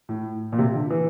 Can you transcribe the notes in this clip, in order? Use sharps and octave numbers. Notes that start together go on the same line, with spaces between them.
A2
A#2
C3
D3
E3